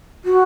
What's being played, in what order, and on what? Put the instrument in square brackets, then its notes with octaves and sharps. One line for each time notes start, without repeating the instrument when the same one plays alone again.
[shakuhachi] F#4